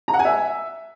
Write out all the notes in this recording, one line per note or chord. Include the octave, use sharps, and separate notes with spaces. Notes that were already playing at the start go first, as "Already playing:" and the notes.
A#5
F#5
G#5
E5